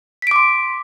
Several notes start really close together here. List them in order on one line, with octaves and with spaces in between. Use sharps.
B6 D7 D6 C6